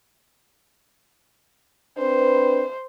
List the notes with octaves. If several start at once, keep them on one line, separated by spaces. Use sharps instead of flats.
C4 D4 B4 C5